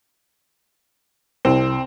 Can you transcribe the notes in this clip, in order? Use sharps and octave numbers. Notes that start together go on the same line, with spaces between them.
C2 C4